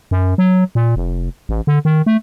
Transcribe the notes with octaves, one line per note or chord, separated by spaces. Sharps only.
F#2
F#3
A#2
F1
A1
D3
D#3
A3